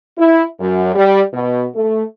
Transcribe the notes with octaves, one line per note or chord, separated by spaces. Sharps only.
E4
F#2
G3
B2
A3